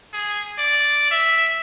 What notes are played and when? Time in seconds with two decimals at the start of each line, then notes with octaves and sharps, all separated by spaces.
0.13 G#4
0.58 D5
1.11 E5